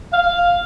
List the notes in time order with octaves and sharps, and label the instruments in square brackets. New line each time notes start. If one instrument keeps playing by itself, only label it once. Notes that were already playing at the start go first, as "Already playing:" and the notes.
[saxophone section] F5